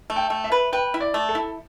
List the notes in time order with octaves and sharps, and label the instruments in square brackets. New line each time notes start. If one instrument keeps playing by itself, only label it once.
[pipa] A3
[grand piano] G5
[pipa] A3
[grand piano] E5
[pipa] B4
[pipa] B4 [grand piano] G5
[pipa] E4
[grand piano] D5
[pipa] A3
[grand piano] A4
[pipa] E4